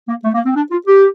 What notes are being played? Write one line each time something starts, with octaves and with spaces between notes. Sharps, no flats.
A#3
A3
A#3
C4
D4
F4
G4